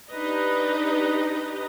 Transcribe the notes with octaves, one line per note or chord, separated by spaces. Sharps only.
D4 D#4 G4 B4 D#5 A#5